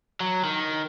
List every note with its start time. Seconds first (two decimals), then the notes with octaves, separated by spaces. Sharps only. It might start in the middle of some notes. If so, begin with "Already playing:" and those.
0.20 F#3
0.44 D#3